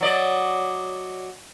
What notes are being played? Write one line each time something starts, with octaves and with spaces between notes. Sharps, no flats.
F#3 D5 D#5